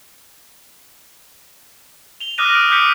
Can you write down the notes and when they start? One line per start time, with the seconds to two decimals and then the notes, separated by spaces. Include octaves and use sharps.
2.20 F7 G7
2.38 D6 D#6 F6 F#6 A#6 D#7
2.55 D#6 D7
2.71 D6 F#6 G6 B6 C#7